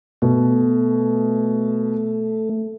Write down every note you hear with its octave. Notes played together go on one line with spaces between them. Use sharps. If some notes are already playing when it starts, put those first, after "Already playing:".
B2 A3